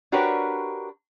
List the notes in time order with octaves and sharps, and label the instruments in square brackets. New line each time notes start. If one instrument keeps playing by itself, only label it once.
[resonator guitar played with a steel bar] D4 F#4 G4 A#4 B4 C#5